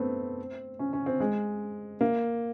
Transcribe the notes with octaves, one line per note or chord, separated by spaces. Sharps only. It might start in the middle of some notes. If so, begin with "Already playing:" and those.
Already playing: A3 B3 C4
C#4
C#4
C4
G#3
A#3